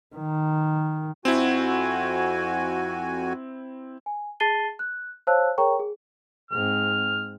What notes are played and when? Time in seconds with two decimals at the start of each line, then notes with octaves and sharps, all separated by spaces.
0.16 D#3
1.25 F2 C4 E4 F#4 G#5
4.06 G#5
4.40 G#4 A5 A6 C7 D#7 G7
4.79 F#6
5.27 C5 C#5 F5 A5 E6 F#6
5.58 G#4 A#4 C#5 G5 A#5 C#6
5.79 G#4
6.51 G#2 C4 F6